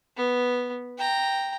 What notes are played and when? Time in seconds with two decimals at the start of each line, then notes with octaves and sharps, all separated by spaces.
0.17 B3
0.98 G5 A#5